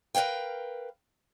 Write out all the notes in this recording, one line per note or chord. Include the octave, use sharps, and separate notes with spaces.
A#4 B4 C#5 F5 G5